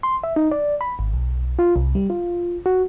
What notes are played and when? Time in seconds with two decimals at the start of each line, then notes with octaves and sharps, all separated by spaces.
0.03 C6
0.23 E5
0.36 D#4
0.51 D5
0.81 B5
0.99 G#1
1.14 B1
1.59 F4
1.76 C2
1.95 G3
2.10 F4
2.66 F#4